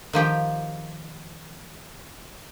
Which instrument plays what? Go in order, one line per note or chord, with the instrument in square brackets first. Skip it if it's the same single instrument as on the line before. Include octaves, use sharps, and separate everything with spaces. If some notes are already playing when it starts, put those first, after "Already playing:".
[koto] D#3 F3 G4 G5